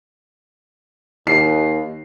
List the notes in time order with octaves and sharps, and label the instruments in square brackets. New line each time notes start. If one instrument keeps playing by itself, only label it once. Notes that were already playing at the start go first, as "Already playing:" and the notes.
[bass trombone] D#2 [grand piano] C7